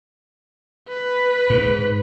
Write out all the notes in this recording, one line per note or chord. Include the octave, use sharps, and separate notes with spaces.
B4
G#2